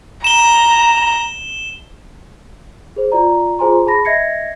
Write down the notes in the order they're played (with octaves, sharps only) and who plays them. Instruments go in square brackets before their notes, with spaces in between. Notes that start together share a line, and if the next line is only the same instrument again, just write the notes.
[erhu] A#5 [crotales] E7 G7
[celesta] G#4 C5
F4 D5 A#5
F4 G#4 C5 G#5 A#5 C6
G#4 A5 B5 A#6
D#5 E5 G#6 A#6 C7 C#7